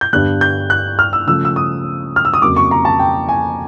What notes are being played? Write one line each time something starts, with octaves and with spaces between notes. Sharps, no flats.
G6
G2 D3 G3 B3 F#6
G6
F#6
F6
E6
C#3 F3 A3 E6
E6
D#6
F6
E6
D#6
F2 C#3 F#3 A#3 D6
C#6
A#5
A5
G5
G#5